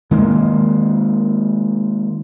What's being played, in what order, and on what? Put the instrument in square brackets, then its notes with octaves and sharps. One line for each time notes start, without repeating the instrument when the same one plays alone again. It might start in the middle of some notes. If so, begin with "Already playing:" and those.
[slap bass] D#3 G#3 A#3